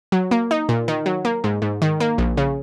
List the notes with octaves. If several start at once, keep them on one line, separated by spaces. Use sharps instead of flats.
F#3
A#3
D#4
A#2
D#3
F#3
A#3
G#2
G#2
D#3
A#3
A#1
C#3